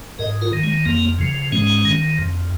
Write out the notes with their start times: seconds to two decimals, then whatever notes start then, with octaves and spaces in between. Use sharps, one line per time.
0.19 G#2 A#4 D#5
0.41 F4 A#4
0.53 D#3
0.64 G#3
0.86 F2 A#3
1.19 C#3 F3
1.52 G#2 G#3 C#4
1.85 D#3
2.18 F2